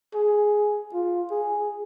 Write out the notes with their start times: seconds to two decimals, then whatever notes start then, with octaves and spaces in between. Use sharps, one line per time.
0.14 G#4
0.93 F4
1.31 G#4